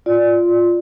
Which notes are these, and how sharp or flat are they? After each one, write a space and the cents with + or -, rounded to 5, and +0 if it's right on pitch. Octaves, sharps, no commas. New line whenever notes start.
F4 +0 D5 +0